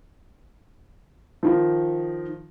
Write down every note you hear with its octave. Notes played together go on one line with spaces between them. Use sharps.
D#3 F3